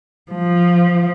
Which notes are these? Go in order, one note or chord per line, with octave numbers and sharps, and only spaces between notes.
F3